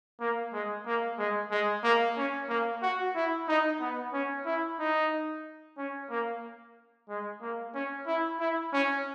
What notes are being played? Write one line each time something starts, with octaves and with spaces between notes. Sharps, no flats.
A#3
G#3
A#3
G#3
G#3
A#3
C#4
A#3
F#4
E4
D#4
B3
C#4
E4
D#4
C#4
A#3
G#3
A#3
C#4
E4
E4
C#4